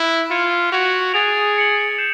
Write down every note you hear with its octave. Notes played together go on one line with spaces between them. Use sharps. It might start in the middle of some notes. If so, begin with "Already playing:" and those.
Already playing: E4 F#6 B6 D7
F4 G#6 C#7 E7
F#4 G#6 B6 D7 F7
G#4 A6 D7 F7
A6 C#7 F#7
G6 C7 E7